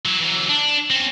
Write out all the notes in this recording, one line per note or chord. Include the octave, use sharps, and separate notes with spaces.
F#3 E4
E3 F#3
D4
C4 C#4